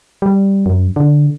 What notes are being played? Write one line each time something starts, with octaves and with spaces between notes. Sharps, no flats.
G3
F#2
D3